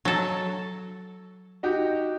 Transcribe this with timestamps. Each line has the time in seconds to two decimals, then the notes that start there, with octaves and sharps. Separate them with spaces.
0.05 F#3 A4
1.63 D#4 F#4 G4